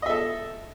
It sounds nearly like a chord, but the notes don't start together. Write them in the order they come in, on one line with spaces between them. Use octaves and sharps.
D#5 E5 A4